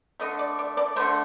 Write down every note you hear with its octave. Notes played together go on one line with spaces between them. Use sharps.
D3 A3 D#5
D5
D5
D5
D3 A3 C5